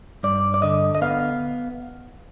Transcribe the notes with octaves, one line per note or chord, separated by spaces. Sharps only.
G2 D5
D5
D3 D#5
D#5
B3 F5